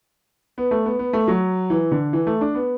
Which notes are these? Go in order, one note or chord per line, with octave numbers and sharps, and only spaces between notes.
B3
A3
B3
B3
A3
F#3
E3
D3
E3
A3
D4
B3